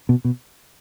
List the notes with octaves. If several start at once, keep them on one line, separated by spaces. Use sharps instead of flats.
B2
B2